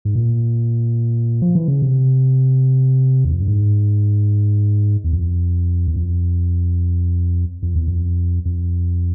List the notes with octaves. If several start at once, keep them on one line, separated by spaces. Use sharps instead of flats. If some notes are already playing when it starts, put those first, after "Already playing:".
G#2
A#2
F3
E3
C#3
C3
E2
F2
G2
G#2
E2
F2
E2
F2
F2
E2
F2
F2